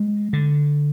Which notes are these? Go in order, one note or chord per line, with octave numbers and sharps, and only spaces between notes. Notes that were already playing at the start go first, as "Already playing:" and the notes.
Already playing: G#3
D3